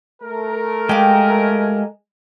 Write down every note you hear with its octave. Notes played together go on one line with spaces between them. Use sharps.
A3 A#4
G#3 G4 F5